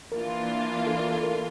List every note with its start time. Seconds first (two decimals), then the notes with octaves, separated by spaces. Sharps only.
0.11 E3 A#3 D4 F4 A#4
0.87 A4
0.99 A#4
1.11 A4
1.23 A#4